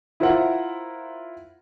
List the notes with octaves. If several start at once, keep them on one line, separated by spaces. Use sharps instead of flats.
E4 F4 A#4 C5 E5 F#5